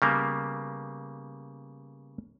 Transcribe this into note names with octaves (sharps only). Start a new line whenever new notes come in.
C#3 G3 A#3 B3